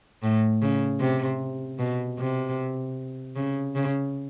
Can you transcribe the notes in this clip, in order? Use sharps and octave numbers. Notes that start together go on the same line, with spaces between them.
A2
C#3
C3
B2
C3
C#3
C#3